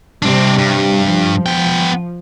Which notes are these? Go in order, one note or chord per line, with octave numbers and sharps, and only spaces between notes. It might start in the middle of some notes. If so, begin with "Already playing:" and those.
C3 G3 C4 D4
G2
F3
B3 G5